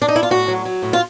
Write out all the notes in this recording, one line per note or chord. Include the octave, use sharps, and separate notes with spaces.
D4
D#4
E4
F4
A2 F#4
F#3
F#3
A2
F4